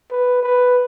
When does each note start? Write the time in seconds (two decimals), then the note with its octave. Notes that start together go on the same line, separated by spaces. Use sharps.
0.11 B4
0.43 B4